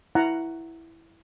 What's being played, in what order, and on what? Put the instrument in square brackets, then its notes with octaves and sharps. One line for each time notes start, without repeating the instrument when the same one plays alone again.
[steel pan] E4 F#5 A#5